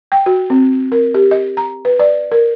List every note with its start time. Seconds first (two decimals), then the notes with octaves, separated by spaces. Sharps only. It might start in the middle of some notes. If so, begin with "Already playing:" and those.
0.12 G5
0.26 F#4
0.50 C4
0.92 A#4
1.14 G4
1.31 D#5
1.57 A#5
1.85 B4
1.99 D5
2.32 A#4